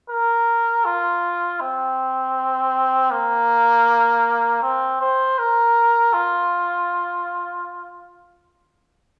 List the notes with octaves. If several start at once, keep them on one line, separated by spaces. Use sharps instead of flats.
A#4
F4
C4
A#3
C4
C5
A#4
F4